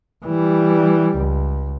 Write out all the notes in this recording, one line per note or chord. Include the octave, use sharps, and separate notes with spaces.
E3 G3
C#2